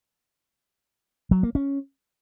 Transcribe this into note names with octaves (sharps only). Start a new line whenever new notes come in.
F#3
A#3
C#4